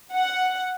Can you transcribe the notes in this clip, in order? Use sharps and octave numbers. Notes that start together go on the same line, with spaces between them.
F#5